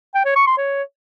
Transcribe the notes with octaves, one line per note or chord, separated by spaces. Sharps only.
G5
C#5
C#6
C6
C#5